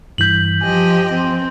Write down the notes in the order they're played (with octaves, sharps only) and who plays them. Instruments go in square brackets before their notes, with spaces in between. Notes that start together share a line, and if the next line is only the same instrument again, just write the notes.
[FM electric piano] G2 E3 B6 [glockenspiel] G6 F#7
[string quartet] F3 G4 D#5 [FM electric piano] G#5
[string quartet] C4